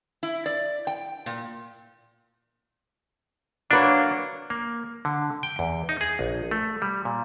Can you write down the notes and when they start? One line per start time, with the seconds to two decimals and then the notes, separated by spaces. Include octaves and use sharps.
0.23 E4
0.46 D5
0.87 G5
1.26 A#2
3.71 F#3 A#3 D4 B4 C#5
4.50 A#3
5.05 D3
5.43 G5
5.59 E2
5.89 D#4
6.01 G#4
6.19 A#1
6.51 A3
6.82 G3
7.05 A#2